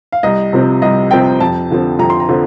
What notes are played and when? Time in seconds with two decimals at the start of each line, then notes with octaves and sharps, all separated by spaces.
0.12 F5
0.23 C2 D#5
0.53 C3 F3 C4
0.82 C2 D#5
1.11 C3 F3 C4 G5
1.40 F2 A5
1.70 D3 F3 C4
1.99 F2 A#5
2.10 C6
2.20 A#5
2.29 D3 F3 C4